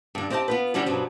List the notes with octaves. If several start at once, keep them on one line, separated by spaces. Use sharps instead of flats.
G2 D3
C4 G4 D#5 F#5 A5
B3 F4 B4
D3 G3 C#4 F#4 G4
G2 B2 F3 F#3